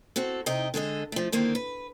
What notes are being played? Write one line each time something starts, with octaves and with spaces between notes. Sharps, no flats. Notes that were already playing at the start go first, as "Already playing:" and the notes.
C4 F#4 A4
C3 D#4 D#5 G5
D3 G#3 A4 D#5
F3 A3
D3 D#3 A#3 C4
B4